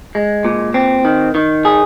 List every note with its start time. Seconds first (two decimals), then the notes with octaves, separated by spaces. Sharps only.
0.15 G#3
0.45 A#2
0.74 C4
1.05 D#3
1.35 D#3
1.65 G#4